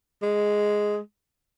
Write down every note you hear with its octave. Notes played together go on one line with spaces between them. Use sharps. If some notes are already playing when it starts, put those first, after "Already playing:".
G#3